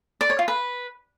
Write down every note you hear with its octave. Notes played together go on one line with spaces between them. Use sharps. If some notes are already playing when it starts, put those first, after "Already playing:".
D5
C#5
F4
B4